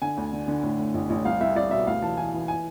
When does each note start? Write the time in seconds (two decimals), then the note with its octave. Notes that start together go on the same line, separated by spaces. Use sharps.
0.02 D3 G#5
0.17 D2
0.33 D3
0.48 D3
0.63 A2
0.79 A2
0.94 A1
1.10 A1
1.25 C2 F5
1.40 C2 E5
1.56 C2 D5
1.71 B2 E5
1.87 D2 F5
2.02 E3 A5
2.17 E3 G#5
2.33 E3
2.48 G#5